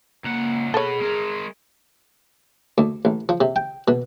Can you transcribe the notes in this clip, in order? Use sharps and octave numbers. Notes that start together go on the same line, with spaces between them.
C#2 A#3 F#5
B2 G#4 A4 B4 C#5
G#3 A#4
D2
A1
F3
C3
G5
B2